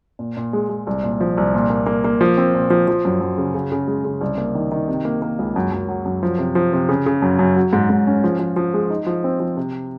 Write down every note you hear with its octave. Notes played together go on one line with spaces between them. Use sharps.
A#2
A#2
G#3
G#3
C2
A#2
F3
C2
A#2
A#3
A#3
A#3
F3
C4
A#2
F3
F3
F#2
F#2
C#3
C#3
C#3
G#3
C#3
C2
A#3
D#3
D#3
C3
A#3
A#3
C#2
F#2
F#2
F#3
F#2
F3
C3
F3
C3
C#3
C#3
F#2
F#2
F#3
G#2
G#2
C#4
F3
F3
F3
G#3
D#4
F3
C4
F3
C3